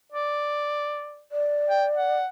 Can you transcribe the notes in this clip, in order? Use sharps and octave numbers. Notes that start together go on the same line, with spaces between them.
D5
D5
G5
F#5